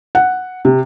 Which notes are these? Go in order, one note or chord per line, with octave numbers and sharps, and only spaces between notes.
F#5
C3